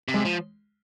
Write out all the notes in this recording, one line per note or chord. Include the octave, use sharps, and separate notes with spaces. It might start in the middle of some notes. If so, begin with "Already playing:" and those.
C3
G#3
F3